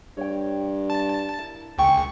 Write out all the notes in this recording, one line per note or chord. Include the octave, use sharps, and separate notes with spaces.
G2 C#5 G5
A5
E4 A#4
C#2 A#4 G5 G#5 C#6